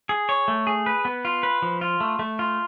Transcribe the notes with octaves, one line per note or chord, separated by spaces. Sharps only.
G#4
C#5
A3
G#4
B4
B3
F4
B4
F3
F4
A3
A3
F4